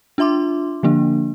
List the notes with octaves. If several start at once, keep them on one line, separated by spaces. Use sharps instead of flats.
D4 F4 E5 C6 D6
D3 F3 A#3 D4